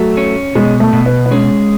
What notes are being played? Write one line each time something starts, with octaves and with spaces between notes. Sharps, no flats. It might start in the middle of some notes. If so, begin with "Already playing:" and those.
Already playing: F#3 A3
C#4
B2 G#3
A3
B2
B3
B3
G#3 C#4